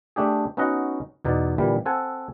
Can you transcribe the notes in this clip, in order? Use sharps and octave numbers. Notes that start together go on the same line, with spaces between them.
A3 D4 G4 G#4
B3 C#4 D#4 F#4 D#5 F#5
E2 B2 D#4 D5
A#2 D3 E3 G3
C4 A4 F#5 G#5